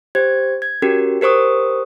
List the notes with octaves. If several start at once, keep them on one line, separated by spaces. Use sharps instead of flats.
G4 C5 G#6
G#6
C#4 F#4 G4 A#4
G4 A#4 C5 C#6 D#6